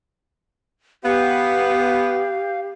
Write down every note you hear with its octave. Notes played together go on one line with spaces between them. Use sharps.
B3 G4 F5